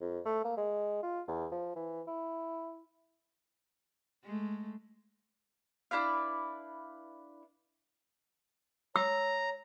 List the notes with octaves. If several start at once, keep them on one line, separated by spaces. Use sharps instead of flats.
F2
A3
A#3
G#3
F4
E2
F3
E3
E4
G#3 A3
D4 E4 B4 F5
C#5 A#5 E6